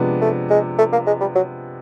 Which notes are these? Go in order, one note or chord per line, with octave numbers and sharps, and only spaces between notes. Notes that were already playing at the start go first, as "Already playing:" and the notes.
Already playing: C3 F3 G#3 B3 D4
A3
G#3
A3
A#3
G#3
G3
F#3